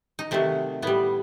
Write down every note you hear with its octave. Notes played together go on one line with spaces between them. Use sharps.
D#4
C3 D#3 F#3 A3 C4
A2 G3 B3